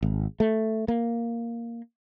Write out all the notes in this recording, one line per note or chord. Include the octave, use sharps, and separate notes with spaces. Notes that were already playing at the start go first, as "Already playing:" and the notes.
G#1
A3
A#3